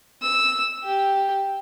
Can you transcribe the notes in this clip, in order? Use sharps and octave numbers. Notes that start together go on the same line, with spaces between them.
E6
G4